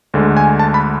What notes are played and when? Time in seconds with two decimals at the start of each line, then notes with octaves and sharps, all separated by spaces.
0.14 D2 D3 G#3
0.37 G#5
0.59 A5
0.74 B5